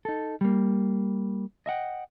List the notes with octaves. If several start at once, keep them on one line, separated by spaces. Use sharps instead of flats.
D#4 A4
G3 A#3
D#5 E5 F#5 G5